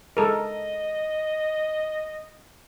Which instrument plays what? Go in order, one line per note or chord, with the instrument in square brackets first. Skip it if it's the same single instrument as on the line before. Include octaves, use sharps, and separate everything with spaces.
[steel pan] G#3 A4 A#4 [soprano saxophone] D#5